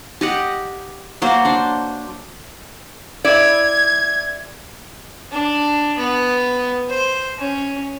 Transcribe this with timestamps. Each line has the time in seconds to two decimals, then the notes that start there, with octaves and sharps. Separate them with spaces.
0.21 G4 D#5 F#5
1.22 F#3 A#3 F#4 C5
1.45 D4 C5
3.25 E4 D5 G#6
5.31 D4
5.98 B3
6.89 C5
7.38 C#4